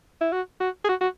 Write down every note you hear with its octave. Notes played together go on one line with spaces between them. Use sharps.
E4
F#4
F#4
G#4
F#4
F#4